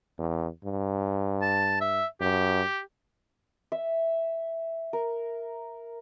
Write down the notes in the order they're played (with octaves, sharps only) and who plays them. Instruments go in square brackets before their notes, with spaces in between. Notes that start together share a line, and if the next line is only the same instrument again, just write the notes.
[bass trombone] E2
G2
[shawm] A5
E5
[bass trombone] F#2 [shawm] G4
[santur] E5
A#4